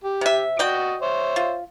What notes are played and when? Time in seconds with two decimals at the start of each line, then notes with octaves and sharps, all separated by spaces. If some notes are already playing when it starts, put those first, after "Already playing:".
0.04 G4
0.21 C3 E5
0.59 F#4 D5 D#5 G5
1.02 C5 C#5 E5
1.36 F4